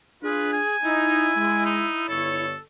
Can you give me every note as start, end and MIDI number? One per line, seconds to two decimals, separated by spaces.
0.23 0.60 62
0.23 0.60 65
0.23 0.77 68
0.23 0.52 71
0.53 1.64 80
0.83 1.29 63
0.83 2.46 64
1.36 1.83 56
1.65 2.04 63
2.08 2.53 31
2.08 2.60 69
2.08 2.53 73